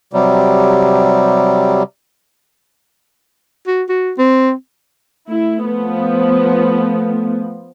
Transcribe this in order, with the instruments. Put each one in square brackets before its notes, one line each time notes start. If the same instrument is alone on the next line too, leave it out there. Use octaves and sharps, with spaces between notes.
[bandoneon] C3 F#3 G3
[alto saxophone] F#4
F#4
C4
[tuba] A3 [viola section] E4
[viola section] F3 B3